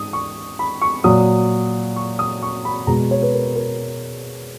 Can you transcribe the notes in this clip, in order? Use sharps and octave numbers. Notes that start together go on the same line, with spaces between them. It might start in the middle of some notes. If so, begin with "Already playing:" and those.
Already playing: G#2 D#6
C#6
B5
C#6
A#2 F#3 D#6
C#6
D#6
C#6
B5
B2 G#3 A#5
C#5
B4
A#4
A#4